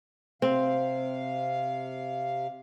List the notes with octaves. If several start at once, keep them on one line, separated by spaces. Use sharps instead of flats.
C3 C4 F5